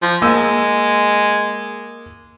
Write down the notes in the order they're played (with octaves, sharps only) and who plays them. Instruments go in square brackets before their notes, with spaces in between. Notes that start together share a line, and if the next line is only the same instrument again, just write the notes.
[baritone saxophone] F3
[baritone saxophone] G#3 [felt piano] A#3 E6 D#7